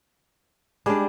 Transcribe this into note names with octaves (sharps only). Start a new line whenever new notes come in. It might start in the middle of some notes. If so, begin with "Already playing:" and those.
G3 G#3 D4